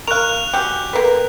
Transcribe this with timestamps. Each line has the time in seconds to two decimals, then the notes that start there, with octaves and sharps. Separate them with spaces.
0.08 A#4 F5 C#6 F#6 F7
0.53 F#3 C#4 G4
0.93 A#3 B3 A4 B4